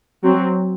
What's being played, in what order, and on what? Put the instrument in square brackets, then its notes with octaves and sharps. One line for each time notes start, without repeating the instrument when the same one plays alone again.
[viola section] F#3 C4